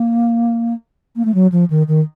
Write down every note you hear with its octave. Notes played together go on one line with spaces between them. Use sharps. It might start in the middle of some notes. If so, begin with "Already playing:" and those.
Already playing: A#3
A#3
A3
F#3
F3
D#3
D#3